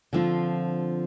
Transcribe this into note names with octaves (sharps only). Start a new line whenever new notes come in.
D3 F3 C4 F4